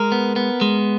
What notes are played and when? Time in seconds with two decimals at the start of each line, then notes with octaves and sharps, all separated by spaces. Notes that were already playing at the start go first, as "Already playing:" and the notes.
Already playing: G#3 A#4
0.12 B3
0.36 B3
0.61 G#3